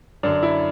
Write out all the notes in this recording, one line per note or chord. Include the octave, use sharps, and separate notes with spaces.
F#2 D3 D4
E4